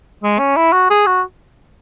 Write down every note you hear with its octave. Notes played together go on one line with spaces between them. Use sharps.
G#3
C#4
E4
F#4
G#4
F#4